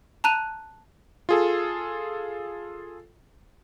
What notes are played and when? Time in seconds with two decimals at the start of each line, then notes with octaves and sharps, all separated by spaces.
0.24 A5 A#5 F#6 D#7
1.29 F4 G#4 A4